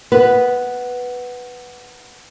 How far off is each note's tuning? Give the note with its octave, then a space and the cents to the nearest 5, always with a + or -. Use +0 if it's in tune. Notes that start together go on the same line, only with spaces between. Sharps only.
B3 +0 B4 -5